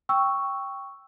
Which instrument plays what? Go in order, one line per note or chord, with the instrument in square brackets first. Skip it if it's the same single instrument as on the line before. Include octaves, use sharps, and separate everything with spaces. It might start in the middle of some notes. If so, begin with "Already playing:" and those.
[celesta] G5 C#6 E6